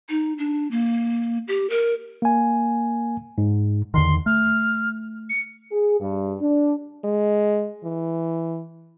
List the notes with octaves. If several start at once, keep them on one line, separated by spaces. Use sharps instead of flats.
D#4
D4
A#3
G4
A#4
A#3 G#5
G#2
E2 D3 D#3 C6
A3 F6
C#7
G#4
G2
D4
G#3
E3